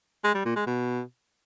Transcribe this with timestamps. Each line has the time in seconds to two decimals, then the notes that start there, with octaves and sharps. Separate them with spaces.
0.24 G#3
0.35 G3
0.45 A#2
0.56 G#3
0.66 B2